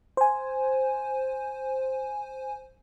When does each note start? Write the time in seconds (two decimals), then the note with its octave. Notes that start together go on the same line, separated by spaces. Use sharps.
0.17 C5 G#5